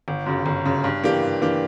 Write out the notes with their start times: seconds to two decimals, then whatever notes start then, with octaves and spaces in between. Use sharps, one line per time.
0.08 G1
0.26 F#2 C#3
0.46 G1
0.65 F#2 C#3
0.84 G2
1.04 E3 A#3 D4 G4
1.22 G2
1.41 E3 A#3 D4 G4